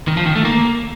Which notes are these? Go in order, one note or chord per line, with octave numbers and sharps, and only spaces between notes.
D#3
F3
D#3
A3
A#3